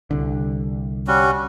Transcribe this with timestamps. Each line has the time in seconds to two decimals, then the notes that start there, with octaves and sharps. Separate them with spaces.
0.11 C2 D3
1.08 G3 C#4 F#4